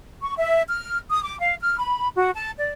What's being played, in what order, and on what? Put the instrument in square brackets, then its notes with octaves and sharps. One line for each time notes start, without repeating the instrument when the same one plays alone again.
[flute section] C#6
E5
F6
D#6
D6
F5
F6
B5
F#4
A5
D5